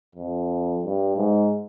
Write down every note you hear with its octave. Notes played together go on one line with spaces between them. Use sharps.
F2
G2
G#2